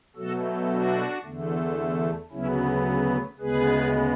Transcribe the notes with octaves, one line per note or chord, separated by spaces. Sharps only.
B2 F#3 A3 F#4 A4
D4 F#4
E2 D3 A3
D2 C#3 F#3 B3 C#4 E4
D2 C#3 G#3 B3 G#4 B4